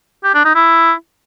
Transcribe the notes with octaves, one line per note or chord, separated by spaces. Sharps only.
G4
D4
D#4
E4